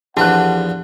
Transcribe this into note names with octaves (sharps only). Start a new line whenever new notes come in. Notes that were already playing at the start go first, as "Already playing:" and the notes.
E2 F3 D4 G4 A4 F#5 A5 F#6